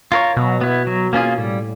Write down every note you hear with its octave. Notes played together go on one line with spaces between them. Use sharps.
F4 A#4 C#5
B2 F#3
B3 E4
F#3
A#3 C#4 F4 G#4
A2 G3